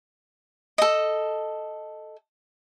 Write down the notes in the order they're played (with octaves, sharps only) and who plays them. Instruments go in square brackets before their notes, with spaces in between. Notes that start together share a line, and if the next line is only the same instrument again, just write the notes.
[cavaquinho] A4 D#5